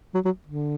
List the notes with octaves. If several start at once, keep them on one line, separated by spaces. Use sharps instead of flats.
F#3
F#3
D3